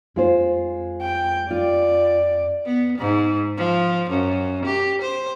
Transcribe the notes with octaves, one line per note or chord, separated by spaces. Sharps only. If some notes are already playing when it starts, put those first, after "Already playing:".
F2 G#3 F4 C5
G5
F4 D5
B3
G#2
F3
F#2
G4
C5